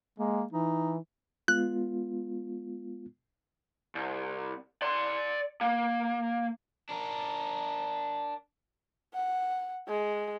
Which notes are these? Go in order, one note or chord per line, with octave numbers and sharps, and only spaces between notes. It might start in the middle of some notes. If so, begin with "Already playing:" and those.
G#3 A#3
E3 D#4
G#3 B3 F4 F#6
C2
D5 C6
A#3
D4 A#4
F#5
G#3